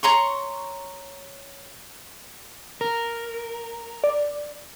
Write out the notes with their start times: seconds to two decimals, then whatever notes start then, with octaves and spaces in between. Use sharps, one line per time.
0.03 C#5 A#5 C6 C#6
2.81 A#4
4.04 D5